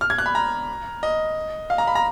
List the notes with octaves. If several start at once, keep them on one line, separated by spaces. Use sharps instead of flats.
F6
G#6
F#6
B5
A#5
D#5
F5
A#5
B5
A#5